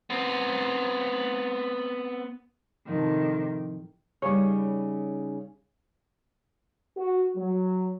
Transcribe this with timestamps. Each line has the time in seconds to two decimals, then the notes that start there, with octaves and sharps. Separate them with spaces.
0.10 B3 C4
2.87 A2 C3 D#3 F3 C4
4.22 C#3 G3 D#4 C#5
6.96 F#4
7.36 F#3